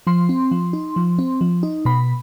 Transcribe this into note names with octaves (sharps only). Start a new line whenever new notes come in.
F3 C6
C4
F3
D#4
F3
C4
F3
D#4
B2 B5